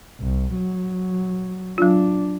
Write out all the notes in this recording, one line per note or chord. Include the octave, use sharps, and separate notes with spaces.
C2
F#3
F#3 D4 F4